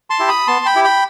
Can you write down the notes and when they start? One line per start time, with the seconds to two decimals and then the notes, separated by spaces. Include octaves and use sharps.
0.10 A5 C6
0.19 E4 G4
0.28 B5 D#6
0.47 B3 A5 C6
0.66 G5 B5
0.75 E4 G4
0.84 G5 B5